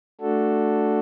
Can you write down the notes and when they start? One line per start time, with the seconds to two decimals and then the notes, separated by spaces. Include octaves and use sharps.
0.21 A3 D4 F#4 A4